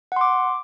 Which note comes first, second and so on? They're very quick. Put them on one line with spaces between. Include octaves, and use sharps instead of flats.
F#5 C6 D6